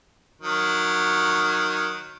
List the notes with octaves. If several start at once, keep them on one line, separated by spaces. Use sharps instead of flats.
D#3 F#3